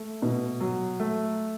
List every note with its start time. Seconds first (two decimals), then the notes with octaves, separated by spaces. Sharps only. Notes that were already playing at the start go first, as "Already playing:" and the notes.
Already playing: A3
0.22 B2
0.61 F#3
1.00 A3